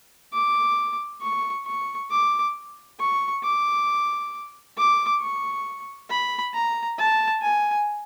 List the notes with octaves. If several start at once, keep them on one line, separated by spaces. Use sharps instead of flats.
D6
C#6
C#6
D6
C#6
D6
D6
C#6
B5
A#5
A5
G#5